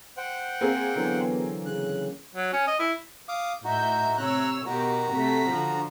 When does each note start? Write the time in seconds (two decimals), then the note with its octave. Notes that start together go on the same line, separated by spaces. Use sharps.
0.17 C5 F#5 G5
0.61 A#3 C4 G#4
0.96 D3 E3 F#3 B3
1.66 C#3 F#6
2.35 F#3
2.53 C#4
2.67 D#5
2.79 E4
3.28 F5 D6 D#6
3.64 A2 D#4 F#4 E5 G6
4.18 C3 C#5 A#5 E6 F#6
4.67 B2 D#3 F#4 G4 A#5
5.13 C3 A3 B6
5.49 D3 F3